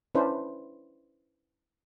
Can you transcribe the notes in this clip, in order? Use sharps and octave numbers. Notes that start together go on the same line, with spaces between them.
C#4 D4 E4 B4 C5